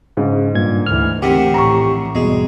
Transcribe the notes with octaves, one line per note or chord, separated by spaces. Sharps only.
G#2 C#3
G2 A#2 G#6
D2 E3 F6
A1 C3 D#3 G4 F#5
A#1 A2 A#5 C#6
G#1 E2 B2 G3 G#3